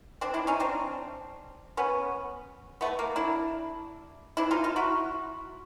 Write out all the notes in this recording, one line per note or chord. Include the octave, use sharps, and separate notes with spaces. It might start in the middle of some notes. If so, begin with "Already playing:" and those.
C4 D4
D4 E4
C#4 D#4
C4 D4
B3 C#4
A3 B3
A#3
D4 E4
D4 E4
D#4 F4
D#4 F4
E4 F#4